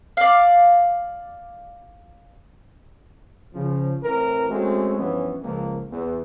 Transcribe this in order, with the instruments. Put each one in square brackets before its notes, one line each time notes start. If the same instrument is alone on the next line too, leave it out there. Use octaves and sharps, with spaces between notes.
[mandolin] D5 F5
[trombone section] C#3 F3
A2 E3 C4 A#4
G#3 A3 C4 C#4 F#4 A4
G2 E3 F3 B3 C#4
C#2 F3 A#3
E2